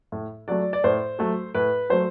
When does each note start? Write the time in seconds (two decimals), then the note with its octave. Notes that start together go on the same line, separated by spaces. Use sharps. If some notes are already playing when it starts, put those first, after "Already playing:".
0.12 A2
0.48 F#3 A3 D5
0.73 D5
0.84 A2 C5
1.19 F#3 A3
1.55 A2 B4
1.90 F#3 A3 C5